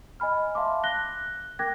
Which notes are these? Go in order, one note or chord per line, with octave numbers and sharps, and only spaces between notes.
D#5 G#5 B5 F6
E5 F5 A5 C6 D6
F#6 A#6 G7
A#4 G5 D6 F#6 G#6 A#6